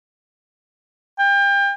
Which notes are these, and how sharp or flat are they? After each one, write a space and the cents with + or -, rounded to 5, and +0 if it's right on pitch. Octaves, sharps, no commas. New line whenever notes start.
G5 +30